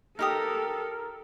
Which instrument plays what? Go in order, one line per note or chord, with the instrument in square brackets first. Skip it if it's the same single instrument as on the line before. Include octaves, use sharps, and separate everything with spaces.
[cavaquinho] D#4 G4 D#6 [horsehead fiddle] A4 [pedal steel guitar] A#4